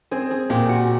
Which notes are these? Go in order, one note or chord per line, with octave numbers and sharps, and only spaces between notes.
C4 G#4
G#4
A#2 G4
F#4